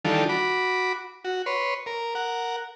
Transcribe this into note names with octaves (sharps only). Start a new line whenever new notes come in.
D#3 E3 G3 D4 F4 A4
F#4 B5 D6
F#4
B4 C#5 C6
A#4
A#4 F#5